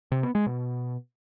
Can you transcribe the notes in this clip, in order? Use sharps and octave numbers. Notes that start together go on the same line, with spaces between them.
C3
B3
G#3
B2